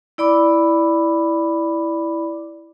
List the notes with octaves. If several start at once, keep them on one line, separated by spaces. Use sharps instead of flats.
E4 D5 B5 D6